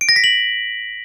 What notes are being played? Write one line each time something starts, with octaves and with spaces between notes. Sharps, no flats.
D7
A#6
B6
F#7